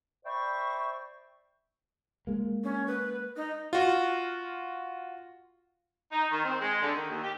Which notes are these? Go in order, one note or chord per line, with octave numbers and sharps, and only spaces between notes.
C5 D5 E5 G5 B5 C#6
G#3 A#3
C#4
B4
D#4
F4 F#4
D#4
D#3
C4
G#3
D3
D#3
D#2
G4